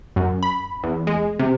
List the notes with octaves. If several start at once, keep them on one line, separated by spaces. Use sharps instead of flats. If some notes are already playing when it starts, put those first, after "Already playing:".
F#2
B5
E2
G#3
C3